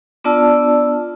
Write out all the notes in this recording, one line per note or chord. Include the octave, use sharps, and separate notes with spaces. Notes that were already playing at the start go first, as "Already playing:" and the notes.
B3 D4 F4 D5 A5 E6